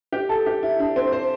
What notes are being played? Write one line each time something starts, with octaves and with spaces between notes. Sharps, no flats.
G4
A4
G4
E4
D4
C4
C5